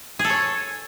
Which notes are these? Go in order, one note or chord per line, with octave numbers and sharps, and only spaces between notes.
G#4
A4
C#5